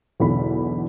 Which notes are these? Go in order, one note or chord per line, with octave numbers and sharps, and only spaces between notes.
B1 E2 D3 B5